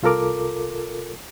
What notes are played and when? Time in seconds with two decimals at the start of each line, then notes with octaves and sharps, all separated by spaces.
0.02 C2 F4 A4 A#4 D6